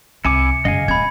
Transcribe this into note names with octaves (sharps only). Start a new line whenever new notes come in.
C2 E4 G#5 D6 C#7
F#2 C#3 D#5 F5 G#5
D1 C4 B5 G#6